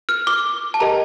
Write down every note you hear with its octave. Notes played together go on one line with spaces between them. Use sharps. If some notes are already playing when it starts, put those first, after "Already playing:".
F6
D6
A5
G4 A#4 D#5 G5 A#5